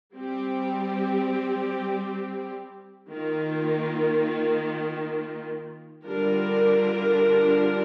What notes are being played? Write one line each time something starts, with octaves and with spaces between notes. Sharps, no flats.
G3 C4 G4
D#3 A#3 F4
D3 G3 D4 F4 A#4